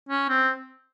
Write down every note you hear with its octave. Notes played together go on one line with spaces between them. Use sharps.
C#4
C4